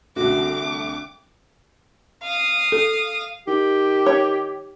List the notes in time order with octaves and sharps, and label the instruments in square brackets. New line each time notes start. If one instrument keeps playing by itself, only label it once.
[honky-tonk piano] C2 D3 A3 [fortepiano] F#4 [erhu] D6
[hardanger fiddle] F5 D#6
[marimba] A4
[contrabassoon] D#3 [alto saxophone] G4
[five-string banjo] C#5